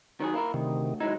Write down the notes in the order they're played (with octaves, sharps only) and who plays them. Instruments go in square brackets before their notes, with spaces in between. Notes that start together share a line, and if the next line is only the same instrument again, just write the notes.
[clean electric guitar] D#3 F#3 G#4
A#3 E4 A#4
[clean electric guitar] D2 [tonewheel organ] C3 D#3
[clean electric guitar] F#3 G#3 D#4 [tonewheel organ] E4